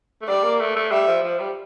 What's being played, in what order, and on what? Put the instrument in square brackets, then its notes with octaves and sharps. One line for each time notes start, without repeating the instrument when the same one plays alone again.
[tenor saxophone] A3
[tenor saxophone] G3 [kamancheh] D5
[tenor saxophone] A#3
A3
A3
[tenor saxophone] G3 [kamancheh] E5
[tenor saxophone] F3
F3
G3